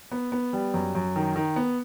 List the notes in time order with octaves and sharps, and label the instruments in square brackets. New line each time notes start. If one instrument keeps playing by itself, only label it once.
[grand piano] B3
B3
G3
F#2
F#2
D#3
D#3
B3